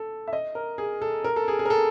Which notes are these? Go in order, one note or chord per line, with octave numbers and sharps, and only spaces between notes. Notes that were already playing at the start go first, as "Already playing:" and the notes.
Already playing: A4
E5
D#5
A#4
G#4
A4
A#4
A4
G#4
G#4
A#4
A4